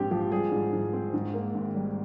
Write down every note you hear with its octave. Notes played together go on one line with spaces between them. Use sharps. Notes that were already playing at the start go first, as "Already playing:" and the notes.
Already playing: A#1 G#2 C4 G4 G#4
F3 G4
G3 G#4
G#2
G#2
C4
G#2
A#3
G#1
G3